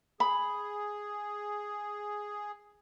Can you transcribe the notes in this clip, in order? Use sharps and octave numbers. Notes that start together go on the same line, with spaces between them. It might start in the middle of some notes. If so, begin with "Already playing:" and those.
G#4 B5